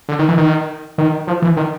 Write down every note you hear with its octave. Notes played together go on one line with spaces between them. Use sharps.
D3
D#3
E3
D#3
D#3
F3
E3
D#3